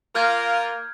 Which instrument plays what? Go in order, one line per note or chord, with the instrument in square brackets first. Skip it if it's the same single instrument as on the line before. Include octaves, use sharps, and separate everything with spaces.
[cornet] A#3 [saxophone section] F4 A#4 [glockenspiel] F6 G6 G#6